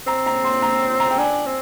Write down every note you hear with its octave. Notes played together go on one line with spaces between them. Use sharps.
C4 A#5
A#5
C6
A#5
A#5
G5
D4 G#5
C4